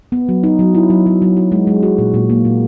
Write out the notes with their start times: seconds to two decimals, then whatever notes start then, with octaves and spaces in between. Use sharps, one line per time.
0.12 B3
0.29 F#3
0.43 D#4
0.59 F#3
0.75 E4
0.90 F#3
1.06 F#3
1.22 F#3
1.37 F#4
1.52 G#3
1.67 G#3
1.83 F#4
1.98 A#2
2.14 A#2
2.30 A#3
2.45 A#2